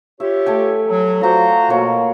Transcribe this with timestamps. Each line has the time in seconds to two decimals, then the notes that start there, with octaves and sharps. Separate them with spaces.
0.20 F4 G4 C#5 E5
0.46 A3 G5 G#5
0.88 F#3
1.21 F4 F#4 C5 D5 A#5
1.70 B2 A#3 C#5 C6